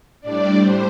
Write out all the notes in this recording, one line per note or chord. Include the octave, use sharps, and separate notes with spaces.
A2 G3 D4 D5
C5